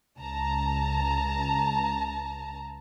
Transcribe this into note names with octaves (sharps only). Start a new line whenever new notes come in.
C#2 A5 A#5